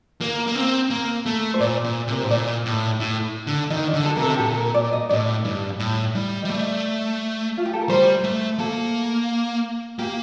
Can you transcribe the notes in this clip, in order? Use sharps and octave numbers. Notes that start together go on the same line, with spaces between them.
A#3
A#3
C4
A#3
A3
C5
A#2 D5
A#2
C3 A#4
A2 C5
A#2 D5
A2
A2
D3
D#3 D#5
D5
D3
A4
C3 A#4
A4
G4
A#2 A4
A#4
D5
D#5
A2 D5
G2
A2
G3
G3 D#5
A3 D5
F4
G4
A4
A#4
G3 C5
A3
A#3 A4
A#3 G4